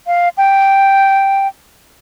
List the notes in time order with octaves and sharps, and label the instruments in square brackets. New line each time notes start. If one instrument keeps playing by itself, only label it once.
[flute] F5
G5